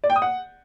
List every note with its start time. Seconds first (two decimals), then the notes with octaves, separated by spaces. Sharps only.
0.04 D5
0.10 G5
0.16 D#6
0.22 F#5